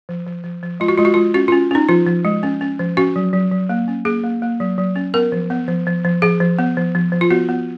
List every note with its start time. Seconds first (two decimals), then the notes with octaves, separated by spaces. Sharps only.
0.09 F3
0.26 F3
0.44 F3
0.63 F3
0.80 G#3 F4
0.88 F#4
0.98 G#3 F4
1.05 F#4
1.14 G#3 F4
1.34 C#4 F#4
1.48 C#4 F4
1.71 C#4 D#4
1.89 F3 F4
2.07 F3
2.25 G#3
2.43 C#4
2.61 C#4
2.79 F3
2.97 C#4 F#4
3.16 F#3
3.33 F#3
3.51 F#3
3.69 A#3
3.88 C#4
4.05 A#3 G#4
4.23 A#3
4.42 A#3
4.60 F#3
4.78 F#3
4.96 C#4
5.14 B3 A#4
5.32 F3
5.50 B3
5.68 F3
5.87 F3
6.05 F3
6.22 F3 G#4
6.41 F3
6.59 B3
6.77 F3
6.95 F3
7.12 F3
7.21 F4
7.30 B3 F#4
7.49 B3